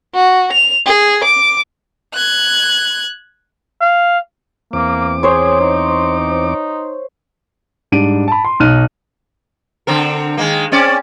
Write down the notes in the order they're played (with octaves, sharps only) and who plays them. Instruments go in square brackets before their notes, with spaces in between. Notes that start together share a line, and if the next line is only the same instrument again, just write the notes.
[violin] F#4
F7
G#4
D6
F#6 G#6
[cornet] F5
[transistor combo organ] E2 C4 D6 [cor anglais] A#3
[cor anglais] G#4 [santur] C5 C#5
[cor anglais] D#4
[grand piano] G#2 G3 D4 D7 D#7
A5 B5
C6
B1 D#4 F6 F#6 D#7
[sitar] D3 C4 A#4
D#3 G#3 A#3
C4 C#4 D5